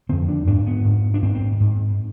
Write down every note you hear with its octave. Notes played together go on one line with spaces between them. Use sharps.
F2 D3 C4
D4
G#2 D4
B3
G#2
D4
G#2 C4
C4
G#2